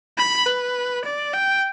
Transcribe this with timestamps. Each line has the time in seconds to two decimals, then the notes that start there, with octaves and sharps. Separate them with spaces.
0.17 B5
0.46 B4
1.04 D5
1.33 G5